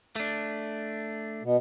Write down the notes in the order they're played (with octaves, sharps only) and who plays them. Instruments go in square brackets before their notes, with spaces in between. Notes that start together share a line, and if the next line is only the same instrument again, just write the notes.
[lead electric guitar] A3 D4
[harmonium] B2